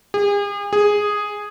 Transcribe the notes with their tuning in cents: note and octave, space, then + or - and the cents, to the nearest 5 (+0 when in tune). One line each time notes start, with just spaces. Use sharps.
G#4 -40
G#4 -5